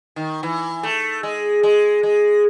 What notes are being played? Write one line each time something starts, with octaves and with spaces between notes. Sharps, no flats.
D#3
E3
A3
G#3
G#3
G#3